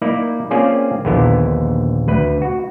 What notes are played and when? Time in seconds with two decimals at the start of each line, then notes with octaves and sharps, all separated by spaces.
0.01 A#3 D#4 E4 D5
0.51 A#3 C4 C#4 F4 G#4 D5
1.05 A#1 D#2 A#2 D3 B3 E4
2.08 D2 B4
2.42 F#4